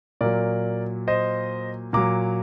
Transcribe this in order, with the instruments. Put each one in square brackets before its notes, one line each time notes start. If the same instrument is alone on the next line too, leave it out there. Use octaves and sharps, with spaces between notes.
[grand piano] A#2 F#3 A#4 D5
C5 D#5
A#2 F#3 A#5 D6